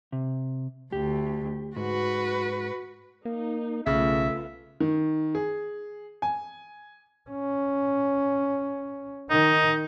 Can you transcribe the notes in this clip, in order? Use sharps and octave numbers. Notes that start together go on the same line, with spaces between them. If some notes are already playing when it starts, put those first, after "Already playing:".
C3
D2 G4
G#2 F#4 B4
A#3 D#4
B1 C#3 A3 B3 F4 E5
D#3
G#4
G#5
C#4
D#3 D#4